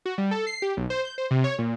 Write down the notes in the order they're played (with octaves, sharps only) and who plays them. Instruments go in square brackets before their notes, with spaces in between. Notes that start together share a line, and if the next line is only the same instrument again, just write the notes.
[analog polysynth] F#4
G3
A4
C7
G4
B1
C5
G6
C5
C3
C#5
A#2